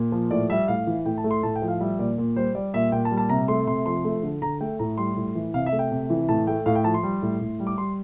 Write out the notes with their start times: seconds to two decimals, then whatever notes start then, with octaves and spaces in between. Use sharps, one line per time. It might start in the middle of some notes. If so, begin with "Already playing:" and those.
Already playing: A#2
0.12 F3
0.31 A2 D5
0.50 G3 E5
0.68 A2 F5
0.87 E3
1.06 A2 G5
1.18 A5
1.24 A3
1.31 C6
1.43 A2 A5
1.56 G5
1.62 F3
1.68 F5
1.80 G3 E5
1.99 A#2 D5
2.18 A#2
2.36 G3 C5
2.55 G3 D5
2.74 A#2 E5
2.92 A#2 G5
3.05 A5
3.11 G3
3.17 A5
3.29 C3 A#5
3.48 A3 C6
3.67 C3 C6
3.86 F3 C6
4.05 A3
4.23 D3
4.42 D3 A#5
4.61 A3 G5
4.79 A2 A#5
4.98 G3 C6
5.16 A2
5.35 E3
5.54 C3 F5
5.66 E5
5.72 A3
5.79 G5
5.91 C3
6.10 E3
6.29 A2 A5
6.47 A3 G5
6.66 A2 F5
6.75 G5
6.84 F3 A5
6.94 C6
7.03 G3
7.22 A2
7.41 A2
7.60 G3
7.67 D6
7.78 G3 C6